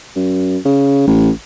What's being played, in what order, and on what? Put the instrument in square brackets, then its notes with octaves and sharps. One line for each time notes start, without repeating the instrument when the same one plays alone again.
[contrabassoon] F#2
C#3
A1